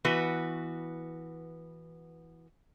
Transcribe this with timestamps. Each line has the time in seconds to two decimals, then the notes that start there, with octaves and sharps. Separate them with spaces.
0.05 E3 B3 F#4 B4